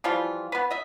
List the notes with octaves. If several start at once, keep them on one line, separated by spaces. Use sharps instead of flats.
E3 F3 G3 F4
B3 B4
D#5 E5